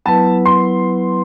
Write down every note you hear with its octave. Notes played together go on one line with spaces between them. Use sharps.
F#3 B3 E4 B4 A5
C6